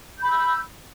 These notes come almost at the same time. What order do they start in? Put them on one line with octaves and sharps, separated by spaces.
G6 B5 E6